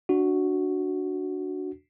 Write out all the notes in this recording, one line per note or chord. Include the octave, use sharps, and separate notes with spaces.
D4 F#4